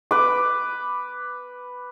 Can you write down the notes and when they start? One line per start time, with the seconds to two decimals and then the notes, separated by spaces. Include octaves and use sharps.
0.11 B4 D6